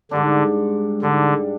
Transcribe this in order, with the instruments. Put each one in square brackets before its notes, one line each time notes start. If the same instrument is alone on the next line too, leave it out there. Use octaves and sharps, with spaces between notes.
[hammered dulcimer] G#2 G3 D4 [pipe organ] D3
[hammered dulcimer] G#2 G3 D4 [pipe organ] D3